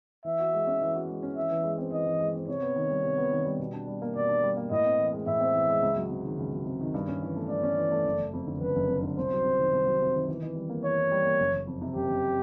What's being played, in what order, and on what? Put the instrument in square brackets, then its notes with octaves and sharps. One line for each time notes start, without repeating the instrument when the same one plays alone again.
[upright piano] E3 [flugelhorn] E5
[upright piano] F#4
G#3
C#4
E3
F#4
G#3
C#4
[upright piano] E3 [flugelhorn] E5
[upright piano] E3
G#3
C4
[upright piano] E3 [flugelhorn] D#5
[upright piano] E3
G#3
C4
[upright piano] C3 [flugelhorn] C#5
[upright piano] B3
D#3
G3
C3
B3
D#3
G3
B2
D4
G3
A#3
[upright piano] B2 [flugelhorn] D5
[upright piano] D4
G3
A#3
[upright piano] A2 [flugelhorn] D#5
[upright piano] C4
E3
G#3
[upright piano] A2 [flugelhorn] E5
[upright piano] C4
E3
G#3
C#2
F#3
C3
D#3
C#2
F#3
C3
D#3
G2
C#4
E3
A3
[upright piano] G2 [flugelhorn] D5
[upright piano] C#4
E3
A3
F#1
F#1
F2
D3
[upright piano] F#1 [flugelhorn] B4
[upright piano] F#1
F2
D3
[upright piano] C2 [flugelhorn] C5
[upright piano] F#3
C3
D#3
C2
F#3
C3
D#3
E3
E3
G3
A#3
[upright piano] E3 [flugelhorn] C#5
[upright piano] E3
G3
A#3
F#1
F#1
F2
C3
[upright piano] F#1 [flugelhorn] G4
[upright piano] F#1